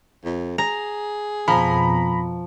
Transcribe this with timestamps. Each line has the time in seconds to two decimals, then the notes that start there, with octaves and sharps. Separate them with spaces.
0.24 F2
0.58 G#4 A#5
1.48 F2 B2 F3 A#5 B5